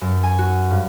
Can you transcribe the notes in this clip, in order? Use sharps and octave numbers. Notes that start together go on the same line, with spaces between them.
F#2
G#5
F#4
G2